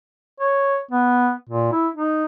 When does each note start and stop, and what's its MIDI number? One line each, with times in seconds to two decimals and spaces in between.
0.40 0.78 73
0.91 1.32 59
1.50 1.72 46
1.72 1.88 64
1.95 2.25 63